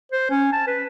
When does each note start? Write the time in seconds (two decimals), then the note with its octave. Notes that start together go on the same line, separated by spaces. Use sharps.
0.12 C5
0.31 C#4
0.53 A5
0.67 B4